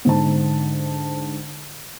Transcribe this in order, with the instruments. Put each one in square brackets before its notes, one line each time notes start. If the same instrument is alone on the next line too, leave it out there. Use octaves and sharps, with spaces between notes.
[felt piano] G#2 D3 C5 A5